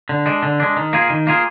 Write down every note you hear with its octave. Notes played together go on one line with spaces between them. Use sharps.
D3
G#3 D4
D3
G#3 D4
D#3
A#3 F4 G#4
D#3
A#3 F4 G#4